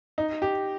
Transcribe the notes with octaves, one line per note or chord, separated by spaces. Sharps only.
D#4
G4